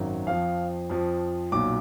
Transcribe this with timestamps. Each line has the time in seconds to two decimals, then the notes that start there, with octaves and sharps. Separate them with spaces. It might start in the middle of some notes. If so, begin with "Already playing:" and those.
Already playing: G#1 F#2 D#3 F#3
0.27 F2 F3 F5
0.90 F2 F3
1.52 B1 A#2 F#3 D6